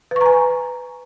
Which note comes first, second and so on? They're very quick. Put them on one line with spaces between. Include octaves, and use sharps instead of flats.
B4 C#6 A#5 G#5